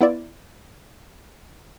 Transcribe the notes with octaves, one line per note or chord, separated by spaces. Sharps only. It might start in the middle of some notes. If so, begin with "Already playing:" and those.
B3 E4 F4 D5